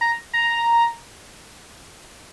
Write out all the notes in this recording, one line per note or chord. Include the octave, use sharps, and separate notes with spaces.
A#5
A#5